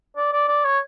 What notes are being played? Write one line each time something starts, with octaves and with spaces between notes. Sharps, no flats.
D5
D5
D5
C#5